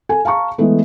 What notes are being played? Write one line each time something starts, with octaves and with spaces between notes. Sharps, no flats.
A4 G#5
F5 A5 A#5 C#6
E3 G#3 A3 B3